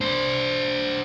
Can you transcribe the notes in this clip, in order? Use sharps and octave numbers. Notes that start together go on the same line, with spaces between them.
D4 C5